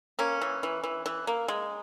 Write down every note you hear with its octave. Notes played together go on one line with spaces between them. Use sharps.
A#3 C#4
E3
E3
E3
E3
A#3
G#3